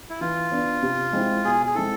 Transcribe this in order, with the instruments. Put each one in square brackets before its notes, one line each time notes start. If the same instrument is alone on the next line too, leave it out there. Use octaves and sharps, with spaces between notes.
[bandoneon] E4
[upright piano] E3 [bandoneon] F4
[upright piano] B3 D4
C3
G#3 C4 E4
[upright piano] B2 [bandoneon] G#4
[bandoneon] G#4
[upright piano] G#3 C4 E4 [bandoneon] A4